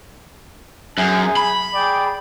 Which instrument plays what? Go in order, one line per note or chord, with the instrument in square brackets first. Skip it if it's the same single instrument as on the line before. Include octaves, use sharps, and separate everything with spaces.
[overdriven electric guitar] F#2 [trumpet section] G#4 G#5
[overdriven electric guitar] B5
[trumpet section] G#4 D5 G5